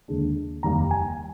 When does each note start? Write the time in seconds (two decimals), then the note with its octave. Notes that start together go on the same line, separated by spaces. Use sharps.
0.08 D#2 D3 G#3 D4
0.63 F1 D#2 D#3 G3 A#3 A#5
0.91 G#5